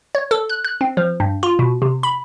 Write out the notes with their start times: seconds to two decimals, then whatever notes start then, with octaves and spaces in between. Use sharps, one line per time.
0.15 C#5
0.31 A4
0.49 F#6
0.65 F#6
0.81 C4
0.97 F3
1.20 G2
1.43 F4
1.59 B2
1.82 C3
2.03 B5